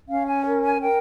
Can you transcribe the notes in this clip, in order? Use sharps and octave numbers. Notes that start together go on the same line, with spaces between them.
C#4 F5
G#5
A#4
G#5
A#4 G5